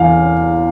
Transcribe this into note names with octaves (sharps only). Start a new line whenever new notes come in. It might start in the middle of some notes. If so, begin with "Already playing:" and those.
Already playing: E2 F5